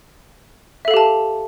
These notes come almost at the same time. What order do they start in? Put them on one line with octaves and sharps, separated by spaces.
E5 A4 F5 G4 A5